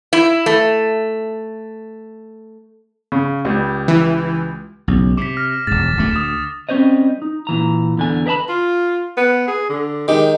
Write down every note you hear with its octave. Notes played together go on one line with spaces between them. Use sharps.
E4
A3
C#3
C#2 G3
E3
B1 G#2 C#3
C3 D6 B6
F6 A#6
E1 G#2 A6 E7
D1 D2 A3
D2 D#6 E7
G3 C4 C#4 C5 C#5 D#5
D#4
A#2 E3 A#5
E2 D3 G#5
A#4 B4 D#5 A5 B5
F4
B3
G#4
D3
D#3 G#3 G4